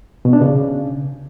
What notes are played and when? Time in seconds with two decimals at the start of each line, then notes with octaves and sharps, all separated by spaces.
0.25 B2
0.33 D4
0.41 C#3